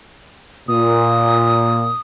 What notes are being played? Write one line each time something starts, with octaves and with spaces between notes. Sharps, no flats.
A#2 D#6